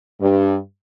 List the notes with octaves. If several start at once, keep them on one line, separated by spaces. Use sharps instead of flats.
G2